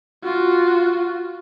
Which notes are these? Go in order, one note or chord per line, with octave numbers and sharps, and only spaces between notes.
F4 F#4